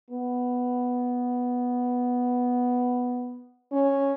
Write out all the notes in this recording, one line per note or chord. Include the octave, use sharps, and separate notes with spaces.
B3
C#4